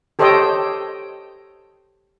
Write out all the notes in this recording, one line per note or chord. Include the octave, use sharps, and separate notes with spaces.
G4 A4 C5 C#5 D#5 G5